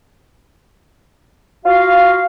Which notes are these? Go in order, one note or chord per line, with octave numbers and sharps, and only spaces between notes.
F4 F#4 F5